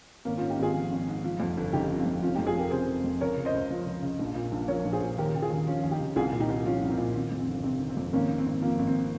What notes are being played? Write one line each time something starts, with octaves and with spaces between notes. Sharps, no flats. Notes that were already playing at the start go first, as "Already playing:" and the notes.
G#1 A#3 C#4
C#4 F4
G#2
D#4 G4
G#1 F4 G#4
F3
G#1
G#2
F3
F2
G1
C#3 D#4 G4
F3
C4 D#4
F2
F1 C#4 F4
D#4 G4
F2
F4 G#4
F1 G4 A#4
C#3 G#4 C5
F1
F2
C#2 A#4 C#5
C#3
C5 D#5
C#2
F3
C#2
C#3
A#1
A#2
A#1
F3 A#4 C#5
A#1
G#4 C5
A#2
D#2 G4 A#4
C#3 G4
F4 G#4
D#2
F3 C#4 F4
D#2
D#4 G4
C#3
C2 F4 G#4
A#2
D#4 G4
C2
F3 C#4 F4
C2
C4 D#4
A#2
D#3 C4
F2
C4
G1
C3 C4
D#3
C4
F2
G#1 A#3 C#4
G#2
C4
G#1
F3 A#3
G#1
C4